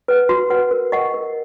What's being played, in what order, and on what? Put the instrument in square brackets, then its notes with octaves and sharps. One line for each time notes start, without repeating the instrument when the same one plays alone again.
[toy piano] B4 F#5
F#4
B4 F#5
A#4
D#5 F#5 C#6
A#4